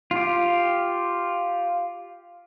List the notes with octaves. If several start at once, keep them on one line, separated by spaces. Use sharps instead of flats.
F4 G4